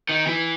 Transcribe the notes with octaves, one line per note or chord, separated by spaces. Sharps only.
D#3
E3